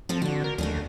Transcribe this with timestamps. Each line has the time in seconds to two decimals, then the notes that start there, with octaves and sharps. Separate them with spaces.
0.09 F3 C4 F4 A4
0.22 D3 D4 F#4
0.44 A#4
0.58 D#2 A3 D4 G#4